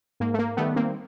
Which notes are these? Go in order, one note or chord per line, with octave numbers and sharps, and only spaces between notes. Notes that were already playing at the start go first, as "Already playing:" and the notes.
G#2 A#3
A3
A#3
D#3 G3 A3 B3
A#3 C4